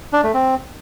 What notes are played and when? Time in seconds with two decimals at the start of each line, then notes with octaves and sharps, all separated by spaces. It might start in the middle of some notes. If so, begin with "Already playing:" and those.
0.13 D4
0.23 A3
0.34 C4